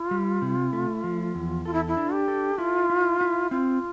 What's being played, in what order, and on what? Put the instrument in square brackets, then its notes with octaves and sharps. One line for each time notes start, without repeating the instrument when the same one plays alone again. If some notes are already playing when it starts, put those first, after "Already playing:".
Already playing: [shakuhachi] F4
[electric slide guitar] G3
C3
A3
F3
E2
[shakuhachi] F4 [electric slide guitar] A4
[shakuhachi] E4
E4
[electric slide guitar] D4
[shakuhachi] G4
[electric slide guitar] A4
[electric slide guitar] E4 [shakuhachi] F4
[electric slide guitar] E4
E4
[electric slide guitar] C4 [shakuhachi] F4